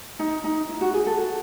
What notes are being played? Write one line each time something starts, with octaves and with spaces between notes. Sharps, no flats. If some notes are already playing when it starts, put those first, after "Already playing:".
D#4
D#4
E4
F#4
G#4
A4
F#4